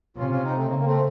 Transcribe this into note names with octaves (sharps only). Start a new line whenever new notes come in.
C3 C#4 F4
C#4 F4
C4 D#4
A3 C4
C#3 A#3
A#3
A3 C4